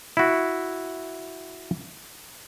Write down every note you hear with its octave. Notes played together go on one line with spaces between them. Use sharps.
E4 F#4